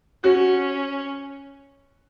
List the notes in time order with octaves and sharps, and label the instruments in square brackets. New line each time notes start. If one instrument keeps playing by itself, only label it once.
[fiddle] C#4 [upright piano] F#4